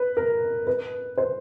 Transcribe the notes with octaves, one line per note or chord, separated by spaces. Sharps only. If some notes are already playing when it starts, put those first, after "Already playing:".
Already playing: B4
A#4
B4
C5